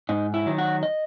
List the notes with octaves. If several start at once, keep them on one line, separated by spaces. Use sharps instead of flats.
G#2 D#4
E4
D#3 F#3
F#4
D#5